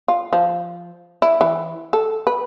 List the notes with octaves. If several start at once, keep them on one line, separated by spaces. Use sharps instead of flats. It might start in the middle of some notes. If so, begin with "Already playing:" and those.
F4
F3
E4
E3
A4
B4